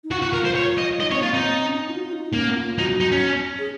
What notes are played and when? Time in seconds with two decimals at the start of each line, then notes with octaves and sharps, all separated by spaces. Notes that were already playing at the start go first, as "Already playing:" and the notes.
0.04 D#4
0.11 F4 F#4
0.22 F#4
0.33 A#4
0.45 C5
0.55 C#5
0.78 D#5
1.00 D#4 D#5
1.11 C4 C#5
1.22 A#3 F4
1.33 C4 D#4
1.45 C4
1.55 C4
1.66 C#4
1.78 D#4
1.89 F4
1.96 F#4
2.03 F4
2.12 D#4
2.34 A#3 C#4
2.55 F4
2.78 D#4 F#4
3.00 D#4
3.12 C#4
3.59 G#4